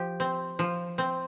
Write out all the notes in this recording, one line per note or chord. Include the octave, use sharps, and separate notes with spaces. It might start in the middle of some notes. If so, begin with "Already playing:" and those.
Already playing: F3 G4
C4
F3
C4